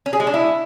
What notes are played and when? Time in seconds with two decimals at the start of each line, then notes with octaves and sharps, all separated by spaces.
0.06 C#4
0.13 G#4
0.20 G#3
0.27 D4
0.34 E4